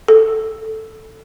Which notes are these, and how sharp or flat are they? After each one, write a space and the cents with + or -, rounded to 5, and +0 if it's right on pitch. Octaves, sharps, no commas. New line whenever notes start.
A4 +5